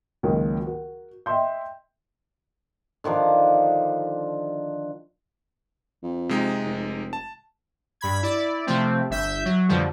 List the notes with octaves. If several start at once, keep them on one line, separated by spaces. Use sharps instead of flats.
C#2 D#3 F#3 A#3
F#4 A#4
D#5 E5 G5 C6 G6
D3 D#3 F3 D4
F2
C3 G#3 D#4
F1
A5
G2 B5 G#6
E4 D5
C3 F3 A3 C4
G1 E5 G6
F#3
F2 B2 D3 F3 G3